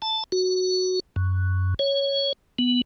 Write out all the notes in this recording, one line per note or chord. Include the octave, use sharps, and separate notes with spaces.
A5
F#4
F#2
C#5
B3